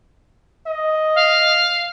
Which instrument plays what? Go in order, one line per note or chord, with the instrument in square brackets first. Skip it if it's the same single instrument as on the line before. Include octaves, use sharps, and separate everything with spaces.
[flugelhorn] D#5
[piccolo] F5